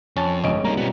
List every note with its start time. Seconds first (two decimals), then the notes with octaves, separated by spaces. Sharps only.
0.17 F2 C#4 A5
0.44 G1 C3 G#3 C#4 D#5 D7
0.65 G3 A#3 D#4 A#5
0.77 B2 B3 C#4 F4